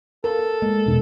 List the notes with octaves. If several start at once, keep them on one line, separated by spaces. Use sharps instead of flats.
A4 A#4
A#4
G#3 A#3
E2 B2 D4